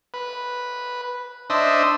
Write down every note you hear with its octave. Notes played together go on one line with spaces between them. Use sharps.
B4
D4 C5 D#5 E5